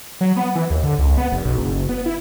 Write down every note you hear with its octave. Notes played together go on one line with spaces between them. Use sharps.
F#3
B3
E3
D#2
D3
C#2
B3
F1
B1
F#1
B3
E4